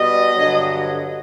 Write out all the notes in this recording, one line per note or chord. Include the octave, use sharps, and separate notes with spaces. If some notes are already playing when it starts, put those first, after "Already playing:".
Already playing: B2 G3 D#5
G2 D3 F#3